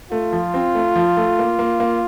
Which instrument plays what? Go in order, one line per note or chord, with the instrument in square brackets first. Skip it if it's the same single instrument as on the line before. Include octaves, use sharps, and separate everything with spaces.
[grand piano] A3 [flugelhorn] F4
[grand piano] F3
C4
A3
F3
A3
A#3
A#3
A#3